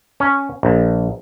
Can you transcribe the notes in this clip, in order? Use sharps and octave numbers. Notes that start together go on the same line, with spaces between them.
C#4
A#1